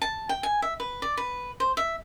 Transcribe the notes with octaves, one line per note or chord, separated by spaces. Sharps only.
A5
G5
G#5
E5
B4
D5
B4
C5
E5